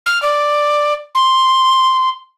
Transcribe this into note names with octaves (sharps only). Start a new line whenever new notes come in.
F6
D5
C6